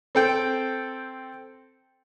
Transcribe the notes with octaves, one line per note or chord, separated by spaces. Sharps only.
C4 A4 G5